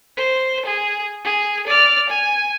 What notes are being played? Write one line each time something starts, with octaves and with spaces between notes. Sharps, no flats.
C5
G#4
G#4
D5 F6
G#5